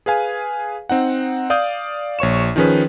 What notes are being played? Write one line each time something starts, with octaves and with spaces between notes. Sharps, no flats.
G#4 B4 F5 G#5
C4 D#4 F#5
D5 F5 D#6 G6
A#1 C#5 C#6 E7
D#3 F3 C#4 G#4 B4